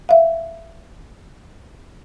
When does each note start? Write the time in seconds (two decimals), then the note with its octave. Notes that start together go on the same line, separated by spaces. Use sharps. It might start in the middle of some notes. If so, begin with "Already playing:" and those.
0.09 E5 F5